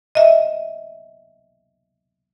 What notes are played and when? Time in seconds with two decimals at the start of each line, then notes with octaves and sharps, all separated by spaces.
0.15 D#5 E5